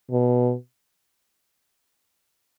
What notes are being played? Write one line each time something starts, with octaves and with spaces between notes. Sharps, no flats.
B2